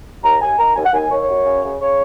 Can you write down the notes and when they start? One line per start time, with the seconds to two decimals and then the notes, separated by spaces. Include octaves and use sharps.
0.22 D#2 A#5
0.41 D#2 G#5
0.58 D#3 A#5
0.75 D#2 G#5
0.85 F#5
0.93 D#2 G#5
1.10 D#2 C#5
1.28 F#2
1.46 C#3
1.63 C#3
1.80 C#3 C#5